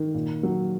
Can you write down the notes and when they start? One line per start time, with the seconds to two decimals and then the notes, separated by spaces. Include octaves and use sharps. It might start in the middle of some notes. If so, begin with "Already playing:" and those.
Already playing: D#3
0.14 A#2
0.43 F#3